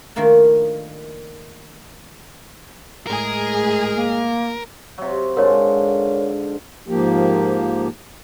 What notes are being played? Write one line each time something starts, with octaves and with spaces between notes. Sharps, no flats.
D#3 F3 A3 A#3 D4
A2 G#3 G#4 A#4
A#3
C3 F#3
G#2 D3 F4 A#4 C#5
G#2 F3 A#3 G4